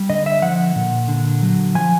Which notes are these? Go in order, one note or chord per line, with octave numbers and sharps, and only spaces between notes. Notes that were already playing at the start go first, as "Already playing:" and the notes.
Already playing: G3
D3 D#5
E5
F3 F#5
A#2
D3
F#3
F3 G#5